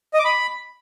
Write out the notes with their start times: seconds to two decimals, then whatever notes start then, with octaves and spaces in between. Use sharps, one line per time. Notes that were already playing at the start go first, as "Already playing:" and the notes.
0.14 D#5
0.19 D6
0.25 B5